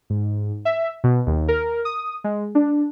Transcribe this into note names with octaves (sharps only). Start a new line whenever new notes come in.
G#2
E5
B2
D#2
A#4
D#6
G#3
D4